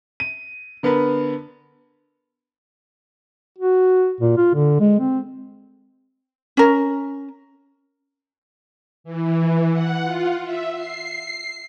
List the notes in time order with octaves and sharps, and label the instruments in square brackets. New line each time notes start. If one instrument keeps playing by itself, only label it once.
[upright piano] D#7
D3 B3 A#4 B4
[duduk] F#4
A#2
F4
D3
G#3
C4
[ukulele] C#4 A#4
[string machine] E3
F#5
F4
E5
C7